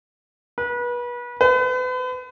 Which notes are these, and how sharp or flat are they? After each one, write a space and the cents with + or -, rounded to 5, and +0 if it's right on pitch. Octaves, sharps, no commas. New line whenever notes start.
B4 -30
B4 +40